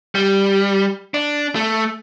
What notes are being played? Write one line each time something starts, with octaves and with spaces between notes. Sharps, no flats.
G3
D4
A3